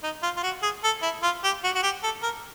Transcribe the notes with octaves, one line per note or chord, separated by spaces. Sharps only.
D#4
F4
F4
F#4
G#4
A4
E4
F4
G4
F#4
F#4
G4
A4
A#4